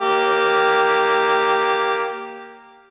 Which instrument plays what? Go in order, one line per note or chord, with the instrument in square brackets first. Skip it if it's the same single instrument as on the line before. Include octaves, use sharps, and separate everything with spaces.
[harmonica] A#3 G4